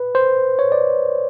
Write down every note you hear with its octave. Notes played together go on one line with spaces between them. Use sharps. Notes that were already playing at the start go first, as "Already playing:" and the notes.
Already playing: B4
C5
C#5
D5